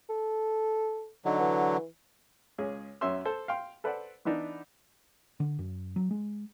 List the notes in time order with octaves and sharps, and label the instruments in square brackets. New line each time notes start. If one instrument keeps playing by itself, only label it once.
[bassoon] A4
[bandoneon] D3 F#3 [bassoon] D#4
[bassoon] E3
[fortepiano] C#2 C#4 G#4
F#2 C#4 E5 C6 E6
A4 C5
F5 G5 C6
A4 B4 C5 D5 F#5
E3 B3 D4 D#4
[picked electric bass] D3
F#2
F#3
G#3